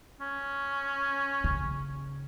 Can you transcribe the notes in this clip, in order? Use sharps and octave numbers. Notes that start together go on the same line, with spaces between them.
C#4
C#3